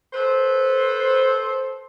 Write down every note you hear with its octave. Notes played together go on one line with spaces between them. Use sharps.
A4 B4 C5